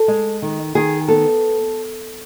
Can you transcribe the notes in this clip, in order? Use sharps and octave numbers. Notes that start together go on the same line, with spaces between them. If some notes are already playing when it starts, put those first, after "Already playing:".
Already playing: A4
G#3
D#3
D#3 G#4
B3 A4